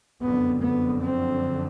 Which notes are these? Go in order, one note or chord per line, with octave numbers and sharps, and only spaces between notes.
F#1 F2 D3 B3
B3
C4